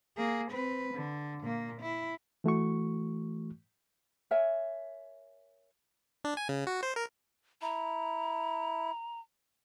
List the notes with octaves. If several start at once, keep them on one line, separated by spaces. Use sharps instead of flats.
A#3 G#4
C4 B4
D3
A#2 A#3
E4
E3 A3 F#4 C#6
A#4 C#5 E5 G#5
D4
G#5
C#3
F#4
C5
A#4
E4 A#5